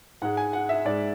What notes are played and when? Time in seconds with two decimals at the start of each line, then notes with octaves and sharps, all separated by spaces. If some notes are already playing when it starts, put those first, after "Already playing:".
0.22 G#2 G#3 F#5
0.37 G#5
0.53 F#5
0.69 E5
0.85 G#2 G#3 D5